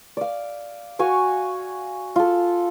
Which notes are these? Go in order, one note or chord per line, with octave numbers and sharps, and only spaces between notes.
D5 F5
F#4 F5 G#5 C#6
F4 A4